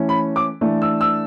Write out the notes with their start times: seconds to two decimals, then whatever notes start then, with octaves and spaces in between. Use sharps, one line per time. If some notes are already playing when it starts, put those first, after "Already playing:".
Already playing: E3 A3 C#4
0.09 B5
0.36 D6
0.61 E3 A3 D4
0.82 E6
1.01 E6